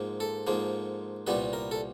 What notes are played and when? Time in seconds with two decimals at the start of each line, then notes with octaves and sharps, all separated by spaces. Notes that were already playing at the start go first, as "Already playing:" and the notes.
Already playing: G#2 F3 A#3
0.20 A4
0.47 G#2 F3 A#3
1.27 C2 A#2 G3 B3 B4
1.53 A#4
1.71 A4